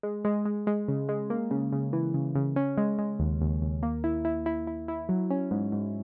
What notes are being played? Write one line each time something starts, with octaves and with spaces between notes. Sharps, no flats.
G#3
G#3
G#3
G#3
C#3
G#3
A#3
C#3
C#3
E3
C#3
C#3
C#4
G#3
G#3
D#2
D#2
D#2
A#3
E4
E4
E4
E4
E4
F#3
C#4
G#2
G#2